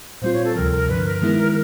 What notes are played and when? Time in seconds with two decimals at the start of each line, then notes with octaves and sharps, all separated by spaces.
0.22 A#2 G3 C4 F4 C5
0.33 C#5
0.44 A4
0.55 D2 C3 F3 A#4
0.72 A#4
0.89 G2 D3 F3 B4
1.05 A#4
1.22 D#3 G#3 B3 E4